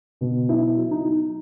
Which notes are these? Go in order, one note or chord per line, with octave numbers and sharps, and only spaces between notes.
B2
F#3 E4
F#3
D#4
F#3